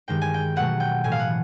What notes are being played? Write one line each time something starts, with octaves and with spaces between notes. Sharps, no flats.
G2 D#3 G#3 G5
G#5
G5
B2 F#3 A3 F#5
G5
A2 E3 A3 G#5
F5
F#5